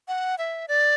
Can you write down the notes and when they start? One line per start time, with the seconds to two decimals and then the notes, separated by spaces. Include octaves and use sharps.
0.08 F#5
0.38 E5
0.68 D5